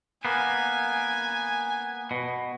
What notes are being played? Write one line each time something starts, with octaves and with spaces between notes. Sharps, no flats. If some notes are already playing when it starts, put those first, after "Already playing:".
A#3 B3 G#5
B2